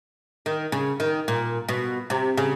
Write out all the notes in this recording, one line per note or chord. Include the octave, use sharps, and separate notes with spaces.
D#3
C#3
D#3
A#2
B2
C3
C#3